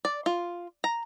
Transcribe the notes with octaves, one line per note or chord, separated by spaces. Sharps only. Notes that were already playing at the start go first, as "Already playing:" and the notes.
D5
F4
A#5